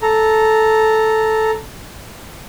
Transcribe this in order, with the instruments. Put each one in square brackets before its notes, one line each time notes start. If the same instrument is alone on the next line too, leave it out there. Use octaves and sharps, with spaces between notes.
[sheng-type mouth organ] A4 A#5